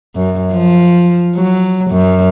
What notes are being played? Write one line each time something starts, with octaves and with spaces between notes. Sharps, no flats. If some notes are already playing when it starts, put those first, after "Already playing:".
F#2
F3
F#3
F#2